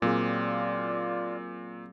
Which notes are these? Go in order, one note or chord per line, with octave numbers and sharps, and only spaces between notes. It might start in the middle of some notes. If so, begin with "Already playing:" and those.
A#2 F#3 C4 F4 G#4 D5